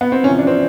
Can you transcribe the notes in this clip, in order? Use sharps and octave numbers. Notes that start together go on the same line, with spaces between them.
B3
C4
E2 C3 F3 C#4
D4
C4